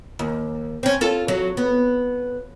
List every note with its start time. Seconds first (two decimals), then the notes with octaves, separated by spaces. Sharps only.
0.19 D#2
0.83 C4 C#4
1.01 F4 A4
1.28 F#3
1.57 B3